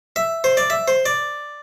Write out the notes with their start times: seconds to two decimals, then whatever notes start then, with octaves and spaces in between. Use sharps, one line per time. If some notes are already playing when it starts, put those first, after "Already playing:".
0.16 E5
0.44 C5
0.57 D5
0.70 E5
0.88 C5
1.06 D5